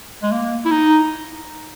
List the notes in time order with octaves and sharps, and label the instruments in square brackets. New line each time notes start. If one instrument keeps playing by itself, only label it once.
[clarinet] G#3
A#3
E4
D#4